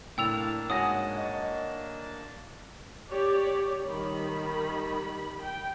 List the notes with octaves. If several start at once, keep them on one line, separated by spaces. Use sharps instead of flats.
A2 A#3 D4 G5 A5 E6 F7
G#2 F#4 C#5 F#5 G#5 D#6 A#6
D#5 C#6
G4 C#5 D5
D#3 G3 B5
G5